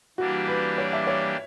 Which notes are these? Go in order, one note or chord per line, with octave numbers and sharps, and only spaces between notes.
E3 G3 A#3 D4 F#4 G4
B4
C#5
E5
C#5